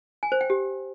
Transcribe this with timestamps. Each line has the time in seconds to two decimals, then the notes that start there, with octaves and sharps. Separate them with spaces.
0.23 G#5
0.32 C5
0.41 G5
0.50 G4